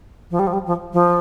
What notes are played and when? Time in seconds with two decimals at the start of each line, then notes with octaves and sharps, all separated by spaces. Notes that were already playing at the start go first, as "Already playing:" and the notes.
0.31 F3
0.39 G3
0.47 F3
0.53 G3
0.67 F3
0.93 F3